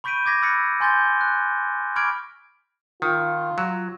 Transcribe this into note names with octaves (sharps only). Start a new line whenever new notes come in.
B5 C#6 G6 B6 D7 D#7
D6 G#6 A#6 B6
B5 E6 F#6 A6 B6 C#7
G#5 C6 G6 A6 G7
F#6
B5 C#6 D6 F6 G#6 D7
D#3 F4
F#3